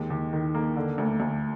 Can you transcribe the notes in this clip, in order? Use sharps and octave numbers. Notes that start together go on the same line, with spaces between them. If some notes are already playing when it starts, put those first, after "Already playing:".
Already playing: D#2 G#3
D#2
D#3
A#3
D3
D2
D2